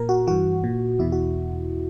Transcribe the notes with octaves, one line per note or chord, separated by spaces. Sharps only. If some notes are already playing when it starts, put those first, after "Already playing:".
Already playing: A#2 A#4
F#4
G2 E3 F#4
A#2
E2 B2 E4
F#4